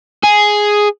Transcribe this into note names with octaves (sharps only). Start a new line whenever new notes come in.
G#4